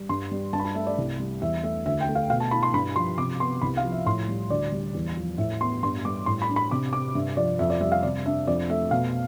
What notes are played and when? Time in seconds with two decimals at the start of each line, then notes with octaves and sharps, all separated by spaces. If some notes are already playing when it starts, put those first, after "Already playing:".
Already playing: G3
0.09 G2 C6
0.31 G3
0.53 G2 A5
0.60 B5
0.65 A5
0.75 A3 E5
0.87 D5
0.98 C2
1.19 G3
1.41 E2 E5
1.63 A3 E5
1.85 D2 E5
2.01 G5
2.08 A3
2.15 F5
2.30 B2 F5
2.40 A5
2.51 E4 B5
2.63 C6
2.73 G2 B5
2.96 F3 C6
3.18 C3 D6
3.40 B3 C6
3.62 C2 B5
3.77 F5
3.84 F3
3.92 E5
4.06 A2 C6
4.28 G3
4.50 D2 D5
4.72 G3
4.94 E2
5.17 F3
5.38 A2 E5
5.61 B3 C6
5.82 G2 C6
6.05 G3 D6
6.26 A2 C6
6.42 B5
6.49 D4
6.56 B5
6.71 C3 D6
6.93 C4 D6
7.15 G2 E5
7.37 F3 D5
7.59 F2 E5
7.70 D5
7.81 G3 E5
7.92 F5
8.03 C3 D5
8.25 D4 E5
8.47 F2 D5
8.69 A3 E5
8.91 B2 F5